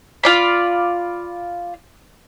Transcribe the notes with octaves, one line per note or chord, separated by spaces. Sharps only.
F4 D5 B5